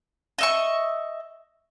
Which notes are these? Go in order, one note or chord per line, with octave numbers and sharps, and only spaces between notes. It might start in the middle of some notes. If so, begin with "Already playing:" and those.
D#5 E5 C#6